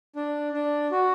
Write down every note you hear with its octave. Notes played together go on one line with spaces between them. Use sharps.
D4
D4
F#4